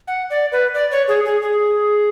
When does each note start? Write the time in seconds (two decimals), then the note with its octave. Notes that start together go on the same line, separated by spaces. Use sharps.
0.08 F#5
0.30 D5
0.52 B4
0.74 D5
0.91 C#5
1.08 G#4
1.26 G#4
1.42 G#4